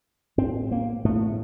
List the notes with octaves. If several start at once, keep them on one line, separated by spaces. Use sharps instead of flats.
A2 C4
A#3
A2 A3